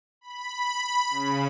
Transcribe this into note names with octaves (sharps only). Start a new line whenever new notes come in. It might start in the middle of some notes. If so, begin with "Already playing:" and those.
B5
C#3